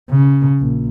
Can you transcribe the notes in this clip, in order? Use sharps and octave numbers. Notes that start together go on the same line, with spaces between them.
C#3
A#1